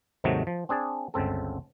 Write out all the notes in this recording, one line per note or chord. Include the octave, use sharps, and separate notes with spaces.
D#2 G#2 C3 D#3 F#3 A3
F3
C4 D4 G#4 D5
G1 C#2 C#3 C4 A4